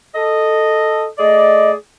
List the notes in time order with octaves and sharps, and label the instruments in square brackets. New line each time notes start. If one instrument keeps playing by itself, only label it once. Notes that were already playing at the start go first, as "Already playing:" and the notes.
[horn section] A4 D#5
[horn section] A3 G#4 D5 [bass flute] D#5